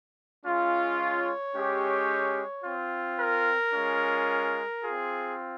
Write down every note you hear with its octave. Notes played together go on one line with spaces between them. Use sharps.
G#3 C#4 F4
C#5
G#3 C#4 G4
C4 F4
A#4
G#3 C#4 F4
C4 F4 G#4